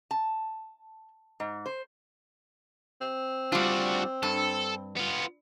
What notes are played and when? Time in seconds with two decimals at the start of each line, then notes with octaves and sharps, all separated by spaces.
0.11 A5
1.40 G#2
1.66 C5
3.01 C4
3.52 G3 D4 F4 F#4
4.23 G2 A4
4.97 B3 F4